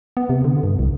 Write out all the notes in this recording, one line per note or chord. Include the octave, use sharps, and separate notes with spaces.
B3
C3
D3
G2
C2